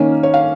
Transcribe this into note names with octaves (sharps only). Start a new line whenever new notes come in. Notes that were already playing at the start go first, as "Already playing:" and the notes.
Already playing: D#3 A#3 C#4
C#5
F5